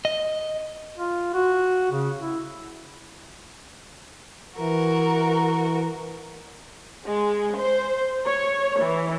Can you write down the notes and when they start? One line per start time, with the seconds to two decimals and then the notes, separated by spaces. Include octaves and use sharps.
0.05 D#5
0.98 F4
1.34 F#4
1.92 C#3
2.19 E4
4.58 E3 F#4 A#4
7.06 G#3
7.57 C5
8.24 C#5
8.79 E3